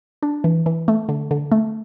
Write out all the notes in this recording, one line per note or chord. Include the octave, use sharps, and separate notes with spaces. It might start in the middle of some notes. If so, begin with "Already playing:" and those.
D4
E3
E3
A3
D3
D3
A3